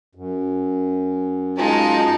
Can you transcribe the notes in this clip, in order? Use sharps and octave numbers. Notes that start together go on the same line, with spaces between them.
F#2
G#3 D#4 F4 A5